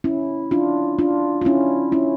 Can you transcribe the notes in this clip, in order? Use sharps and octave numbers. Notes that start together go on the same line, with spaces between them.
C#4 E4
D4 F4
D4 F4
F4
C#4 E4
C#4 E4